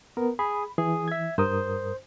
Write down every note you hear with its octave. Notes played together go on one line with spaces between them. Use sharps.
B3 A#4
G#4 B5
E3 G#4
E5 G#6
G2 A#4 C5 D#6